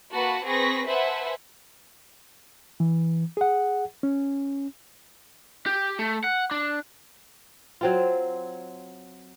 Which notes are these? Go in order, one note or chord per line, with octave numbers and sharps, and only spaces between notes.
A#3 F#4 B4 F#5 A5 B5
C4 G#4 B4 C#6 A#6 B6
B4 C5 E5 F#5 G#5 A5
E3
G#4 F#5
C#4
G4
A3
F#5
D4
F#3 C4 F4